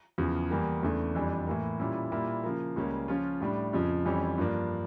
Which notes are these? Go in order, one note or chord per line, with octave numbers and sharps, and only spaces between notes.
E2 C#3 F3
E2 E3 G3 A#3
E2 C#3 E3 A3 D4
F2 E3 G3 D4
A2 E3 A#3
A#2 G3 C#4 E4
A#2 G3 A#3 E4
C#3 F3 A#3
C#2 C#3 G3 A#3 C#4
C#3 F3 C#4 F4
A2 G3 D4
F2 C#3 F3
F2 E3 G3 C#4
G2 F3 A#3 D4